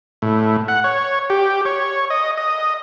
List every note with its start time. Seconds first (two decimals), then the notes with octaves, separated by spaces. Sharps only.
0.22 A2
0.68 F#5
0.84 C#5
1.30 G4
1.65 C#5
2.10 D#5
2.38 D#5